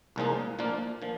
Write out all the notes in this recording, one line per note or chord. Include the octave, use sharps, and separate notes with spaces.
C2 A#2 F3 G#3 D#4
A#2 F3 A#3 D4 F4
A#2 F3